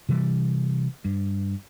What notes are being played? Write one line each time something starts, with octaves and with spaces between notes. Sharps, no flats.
C3 E3 G3
G2